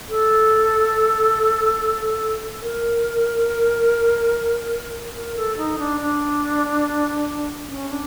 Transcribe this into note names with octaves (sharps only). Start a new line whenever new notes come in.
A4
A#4
A#4
A4
D#4
D4
D4
C#4
D4